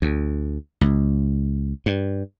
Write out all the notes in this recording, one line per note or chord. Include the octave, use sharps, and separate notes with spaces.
D2
C#2
G2